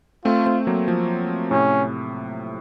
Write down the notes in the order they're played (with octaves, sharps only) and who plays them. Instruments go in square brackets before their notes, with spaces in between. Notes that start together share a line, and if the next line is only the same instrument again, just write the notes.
[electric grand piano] A3 C4 [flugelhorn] F4
[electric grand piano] A3 C4
F#3 A#3
F3 A3
[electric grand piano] A2 C3 [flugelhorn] C#4